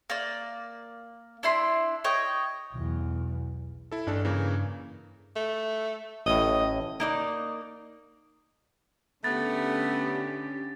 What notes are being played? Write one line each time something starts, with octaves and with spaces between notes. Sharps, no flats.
A#3 D5
D4 E4 C6
C#5 D#5 G5
B1 E2
E4 A4
A1 G2 D4 A4
C#3 E3 A#3
A3
A1 A2 D#5
A#3 D#4 D5
D3 A3 B3 C#4 G4 A6